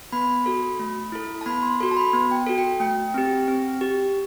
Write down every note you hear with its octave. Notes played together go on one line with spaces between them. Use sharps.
B3 B5
F#4 A4
A3
E4 A4
A5
B3 B5
C6
F#4 A4 C6
A5
B5
B3
G5
A5
F#4 A4
G5
A3 G5
C4 G4
C4
G4